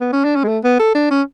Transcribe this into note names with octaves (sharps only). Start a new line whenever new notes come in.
B3
C#4
D4
C#4
G#3
A3
B3
A4
D4
C#4